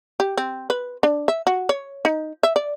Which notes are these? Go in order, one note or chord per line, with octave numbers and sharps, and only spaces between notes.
G4
C4
B4
D4
E5
F#4
C#5
D#4
E5
D5